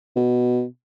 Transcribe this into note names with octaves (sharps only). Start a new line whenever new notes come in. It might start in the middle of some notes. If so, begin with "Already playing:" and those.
B2